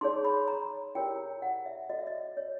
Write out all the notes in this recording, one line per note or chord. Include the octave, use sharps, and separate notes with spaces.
D#4 G#4 C#5 C6
B5
A#5
E4 G4 A#4 C#5 G5
F#5
E5
F#4 A4 C#5 D#5
E5
D#5
C#5